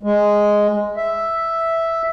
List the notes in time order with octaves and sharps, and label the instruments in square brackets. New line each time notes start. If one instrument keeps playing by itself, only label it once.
[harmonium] G#3
E5